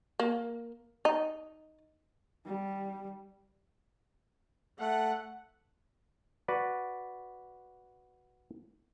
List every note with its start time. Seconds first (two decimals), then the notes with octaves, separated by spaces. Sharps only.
0.20 A#3
1.05 D#4
2.46 G3
4.80 A3 F#5
6.48 F#4 B4 D5